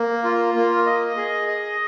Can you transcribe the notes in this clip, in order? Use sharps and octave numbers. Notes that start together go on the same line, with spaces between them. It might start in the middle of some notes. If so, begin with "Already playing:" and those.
Already playing: A#3
F4
A#3
D#5
G#4
D#5